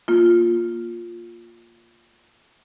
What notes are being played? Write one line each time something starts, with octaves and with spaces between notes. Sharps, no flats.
A#3 F4